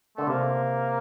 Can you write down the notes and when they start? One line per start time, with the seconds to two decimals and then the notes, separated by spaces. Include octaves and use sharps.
0.17 D3 A3
0.27 C3 A#3